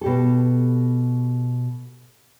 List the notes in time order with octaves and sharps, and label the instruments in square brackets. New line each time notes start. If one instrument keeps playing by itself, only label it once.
[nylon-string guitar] B2 G4 A4